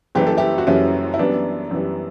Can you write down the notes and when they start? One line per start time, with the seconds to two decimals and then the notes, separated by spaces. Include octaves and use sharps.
0.15 F#1 F#2 E3 G3 G4
0.27 A4
0.38 E4 G4
0.58 F#4
0.67 F#1 F#2 E3 G3 C#4 E4
1.14 E4
1.19 F#2 E3 G3 B3 D4
1.71 F#2 E3 G3